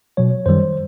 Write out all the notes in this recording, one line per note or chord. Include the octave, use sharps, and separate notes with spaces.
B2 F#3 C#5
F#2 D#3 G3 C5